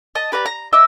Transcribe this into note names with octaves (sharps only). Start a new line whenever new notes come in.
D#5 A5
G4 B4 D5 A#5
A#5
D#5 E5 D6 E6